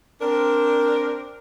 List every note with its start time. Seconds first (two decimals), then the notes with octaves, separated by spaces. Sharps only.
0.21 C4 D4 A#4